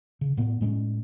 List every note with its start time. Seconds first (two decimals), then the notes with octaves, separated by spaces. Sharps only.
0.21 C#3
0.37 A2 A#3 B3
0.61 A2 G#3 C4 C#4